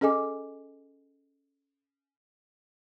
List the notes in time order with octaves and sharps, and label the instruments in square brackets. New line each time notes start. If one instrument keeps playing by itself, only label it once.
[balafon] C#4 G#4 A4 D#5 G#5 D6